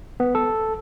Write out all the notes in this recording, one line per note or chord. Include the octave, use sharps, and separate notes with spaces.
B3
A4